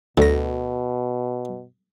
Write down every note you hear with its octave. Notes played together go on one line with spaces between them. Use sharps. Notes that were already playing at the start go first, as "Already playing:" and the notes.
D2 B2 D3 A#6